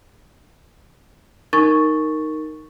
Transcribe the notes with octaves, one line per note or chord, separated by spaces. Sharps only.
D#4 A#4 C#6 A6